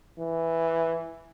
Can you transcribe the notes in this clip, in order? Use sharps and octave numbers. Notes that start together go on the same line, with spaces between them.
E3